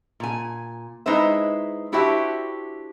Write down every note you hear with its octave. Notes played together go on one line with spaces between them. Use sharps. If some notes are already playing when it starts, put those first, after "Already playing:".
A#2 G#5
G#3 D#4 E4 B4 C5 E5
D4 E4 F#4 G4 C5 E5